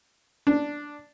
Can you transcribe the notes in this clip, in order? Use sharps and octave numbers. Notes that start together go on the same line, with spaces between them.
D4